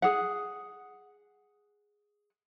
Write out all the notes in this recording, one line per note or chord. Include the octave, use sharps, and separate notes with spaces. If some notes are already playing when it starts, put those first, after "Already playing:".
G#4 F#5